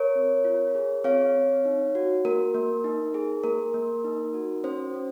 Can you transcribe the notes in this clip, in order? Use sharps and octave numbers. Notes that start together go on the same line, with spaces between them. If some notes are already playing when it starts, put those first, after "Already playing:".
Already playing: A#4 C#5
C4
F4
G#4
C4 C#5 F5
C4
D#4
F#4
A#3 A#4
A#3
D#4
G#4
A#3 A#4
A#3
D#4
F#4
C#4 C5
C#4